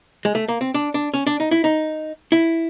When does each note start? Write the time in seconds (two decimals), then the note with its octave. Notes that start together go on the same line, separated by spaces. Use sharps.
0.25 G#3
0.35 A3
0.49 A#3
0.61 C4
0.74 D4
0.94 D4
1.14 C#4
1.27 D4
1.40 D#4
1.51 E4
1.64 D#4
2.32 E4